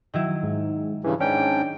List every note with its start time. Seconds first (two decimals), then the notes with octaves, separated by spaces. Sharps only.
0.14 D#3 F#3 E4
0.43 G#2
1.04 G2 C#3 E3
1.20 G#2 C#4 D4 G5